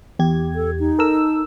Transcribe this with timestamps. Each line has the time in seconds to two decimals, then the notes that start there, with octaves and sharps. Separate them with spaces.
0.19 E2 G4 G#6
0.55 A4
0.80 D#4
0.99 A4 A#4 E6